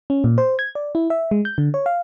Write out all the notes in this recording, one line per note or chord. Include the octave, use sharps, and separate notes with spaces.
C#4
A#2
C5
G#6
D5
E4
E5
G#3
G6
D3
C#5
F5